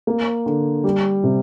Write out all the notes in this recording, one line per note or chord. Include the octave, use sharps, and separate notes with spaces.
A#3
D3
G3
C3